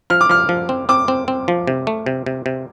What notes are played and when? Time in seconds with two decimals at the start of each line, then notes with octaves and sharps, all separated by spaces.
0.10 F3 F6
0.21 D6
0.29 F3 F6
0.49 F3
0.69 C4
0.89 C4 D6
1.08 C4
1.28 C4
1.48 F3
1.67 C3
1.87 A3
2.06 C3
2.26 C3
2.46 C3